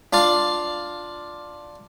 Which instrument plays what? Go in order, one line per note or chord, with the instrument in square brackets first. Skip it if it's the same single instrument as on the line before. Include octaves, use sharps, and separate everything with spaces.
[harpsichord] D4 F4 D5 F5